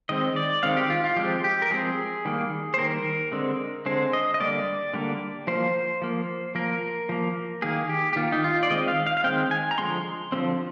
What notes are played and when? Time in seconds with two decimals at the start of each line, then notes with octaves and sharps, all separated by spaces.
0.09 D#3 G#3 C4 D#5
0.36 D5
0.63 D#3 G#3 C4 F5
0.77 G4
0.90 F4
1.04 F4
1.16 F3 G#3 C4 G4
1.44 G4
1.62 A#4
1.71 F3 G#3 C4 G#4
2.25 D#3 G3 A#3
2.74 C5
2.78 D#3 G3 A#3 A#4
3.32 D3 G#3 C4
3.86 D3 G#3 C4 C5
4.13 D#5
4.34 D#5
4.40 D3 G3 A#3 D5
4.94 D3 G3 A#3
5.47 F3 A#3 C5
6.02 F3 A#3
6.55 F3 A#3 A#4
7.09 F3 A#3
7.62 D#3 A#3 G#4
7.89 G4
8.13 G4
8.16 D#3 A#3 F4
8.32 D#4
8.44 F4
8.63 D5
8.70 D#3 G#3 C4 D#5
8.88 F5
9.07 F5
9.17 F5
9.24 D#3 G#3 C4 G5
9.51 G#5
9.71 A#5
9.78 D3 F3 G#3 C4 C6
10.32 D3 F3 G#3 C4